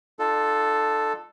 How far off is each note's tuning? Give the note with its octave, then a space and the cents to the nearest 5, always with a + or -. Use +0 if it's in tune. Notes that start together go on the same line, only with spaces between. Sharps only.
D4 +45 F4 +0 A4 +0